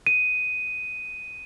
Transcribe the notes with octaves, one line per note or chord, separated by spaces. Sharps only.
D#7